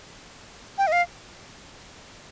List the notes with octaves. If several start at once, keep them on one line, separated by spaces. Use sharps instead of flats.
G5
D#5
F5